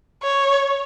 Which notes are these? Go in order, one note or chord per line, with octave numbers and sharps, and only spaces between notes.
C#5